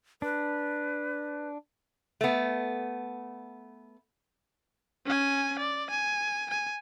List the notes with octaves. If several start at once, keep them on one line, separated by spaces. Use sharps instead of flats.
D4 B4
A3 B3
C#4 G#5
D5
G#5
G#5